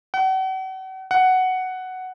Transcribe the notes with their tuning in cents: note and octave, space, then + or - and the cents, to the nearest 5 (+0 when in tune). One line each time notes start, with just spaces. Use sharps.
F#5 +40
F#5 +5